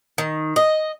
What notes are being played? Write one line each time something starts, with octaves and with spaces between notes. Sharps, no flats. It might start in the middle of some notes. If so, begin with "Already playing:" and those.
D#3
D#5